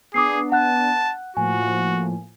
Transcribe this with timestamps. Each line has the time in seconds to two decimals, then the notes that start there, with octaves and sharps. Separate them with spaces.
0.14 B3 D4 G#4 D6 D#6 C7
0.52 F#5 A5 F#6
1.37 A2 F3 A#3 F#4 G#5